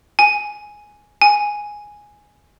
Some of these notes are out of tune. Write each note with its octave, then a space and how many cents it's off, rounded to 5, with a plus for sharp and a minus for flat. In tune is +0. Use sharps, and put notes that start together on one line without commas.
G#5 +5
G#5 +0